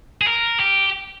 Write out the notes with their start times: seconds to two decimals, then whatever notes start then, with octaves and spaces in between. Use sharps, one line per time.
0.21 G#4
0.27 A#4
0.60 G4